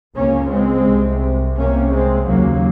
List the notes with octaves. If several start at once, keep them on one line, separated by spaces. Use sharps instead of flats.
C#2 C#3 A#3 C#4
G#3 C4
C2 C3
C2 C3 A#3 C#4
G#3 C4
D#2 C#3 F#3 A#3